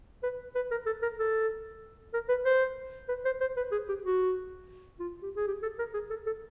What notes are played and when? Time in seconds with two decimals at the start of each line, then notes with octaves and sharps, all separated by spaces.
0.23 B4
0.55 B4
0.71 A#4
0.86 A4
1.03 A#4
1.19 A4
2.14 A#4
2.29 B4
2.45 C5
3.08 B4
3.25 C5
3.41 C5
3.57 B4
3.72 G#4
3.89 G4
4.04 F#4
5.00 F4
5.22 G4
5.36 G#4
5.47 G4
5.63 A4
5.79 A#4
5.94 G#4
6.10 A4
6.26 A4